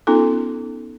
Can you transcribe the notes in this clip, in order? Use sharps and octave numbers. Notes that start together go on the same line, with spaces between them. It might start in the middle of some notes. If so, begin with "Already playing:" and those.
B3 C#4 D#4 F4 A4